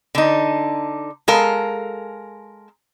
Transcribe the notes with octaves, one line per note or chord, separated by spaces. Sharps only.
D3 D#4
G#3 A4 A#4 F5